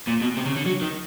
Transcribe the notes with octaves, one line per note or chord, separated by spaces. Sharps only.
A#2
B2
C3
C#3
D3
F#3
D#3